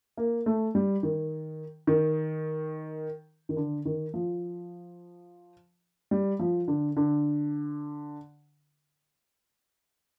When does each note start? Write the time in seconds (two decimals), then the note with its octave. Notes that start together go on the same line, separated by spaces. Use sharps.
0.17 A#3
0.46 A3
0.75 G3
1.03 D#3
1.87 D#3
3.49 D#3
3.57 D3
3.85 D#3
4.14 F3
6.11 G3
6.39 F3
6.68 D3
6.96 D3